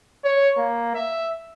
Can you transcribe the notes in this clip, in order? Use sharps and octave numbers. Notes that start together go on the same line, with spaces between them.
C#5
A#3
E5